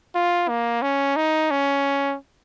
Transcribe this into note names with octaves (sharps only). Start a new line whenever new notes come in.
F4
A#3
C#4
D#4
C#4